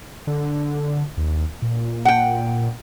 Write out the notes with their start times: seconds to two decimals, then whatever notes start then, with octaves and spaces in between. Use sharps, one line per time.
0.27 D3
1.17 D#2
1.62 A#2
2.05 F#5 G5